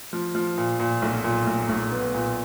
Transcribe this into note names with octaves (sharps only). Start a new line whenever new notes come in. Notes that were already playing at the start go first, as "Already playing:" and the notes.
F3
F3
A#2
A#2
B1
A#2
B1
B1
B3
A#2